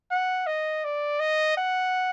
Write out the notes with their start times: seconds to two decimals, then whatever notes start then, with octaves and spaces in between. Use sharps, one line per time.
0.11 F#5
0.47 D#5
0.84 D5
1.20 D#5
1.57 F#5